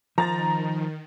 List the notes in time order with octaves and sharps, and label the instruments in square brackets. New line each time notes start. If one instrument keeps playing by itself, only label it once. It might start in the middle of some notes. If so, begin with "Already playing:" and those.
[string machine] D#3 [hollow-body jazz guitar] F3 [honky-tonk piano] A#5 A6